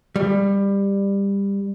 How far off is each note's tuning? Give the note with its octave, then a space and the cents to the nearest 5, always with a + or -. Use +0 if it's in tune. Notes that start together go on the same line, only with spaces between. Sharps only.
G3 +20